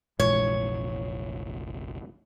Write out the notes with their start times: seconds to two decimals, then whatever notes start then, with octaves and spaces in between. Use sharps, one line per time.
0.19 F1 A#1 A#2 E3 G#3 C#5